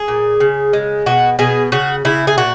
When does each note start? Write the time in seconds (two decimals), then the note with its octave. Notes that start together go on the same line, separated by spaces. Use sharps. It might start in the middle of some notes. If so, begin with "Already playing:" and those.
Already playing: G#4
0.08 A#2
0.40 C#3
0.73 G#3
1.06 B2 F#4
1.39 B2 G#4
1.72 C#3 F#4
2.05 C#3 E4
2.27 G#4
2.38 A#2 F#4